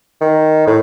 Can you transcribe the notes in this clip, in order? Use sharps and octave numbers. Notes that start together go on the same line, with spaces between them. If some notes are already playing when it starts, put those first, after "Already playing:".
D#3
A2